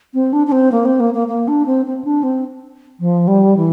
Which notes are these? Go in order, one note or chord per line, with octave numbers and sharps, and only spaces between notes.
C4
D4
D4
C4
A#3
C4
A#3
A#3
A#3
D4
C4
C4
D4
C4
F3
G3
E3